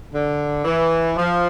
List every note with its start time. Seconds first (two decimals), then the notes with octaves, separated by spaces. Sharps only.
0.12 D3
0.64 E3
1.17 F3